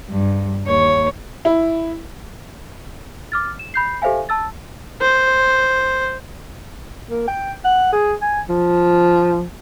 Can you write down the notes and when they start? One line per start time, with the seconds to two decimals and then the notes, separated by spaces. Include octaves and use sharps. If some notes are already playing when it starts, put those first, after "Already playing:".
0.10 G2
0.67 D#2 C#5
1.45 E4
3.32 D6 F6 A6
3.59 E7
3.74 B5 G6 C7
4.02 G4 A4 C5 E5 F5 G#5
4.29 A5 E6 A6
5.01 C5
7.10 A#3
7.28 G5
7.64 F#5
7.92 G#4
8.21 G#5
8.49 F3